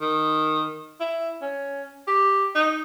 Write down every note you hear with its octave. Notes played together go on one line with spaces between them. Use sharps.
D#3
E4
C#4
G4
D#4